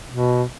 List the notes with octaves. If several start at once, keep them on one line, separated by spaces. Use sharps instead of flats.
B2